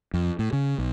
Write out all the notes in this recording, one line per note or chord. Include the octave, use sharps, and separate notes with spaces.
F2
A2
C#3
B1